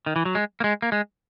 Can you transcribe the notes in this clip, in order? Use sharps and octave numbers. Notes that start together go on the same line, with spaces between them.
D#3
E3
F#3
G#3
A#3
G#3
A#3
G#3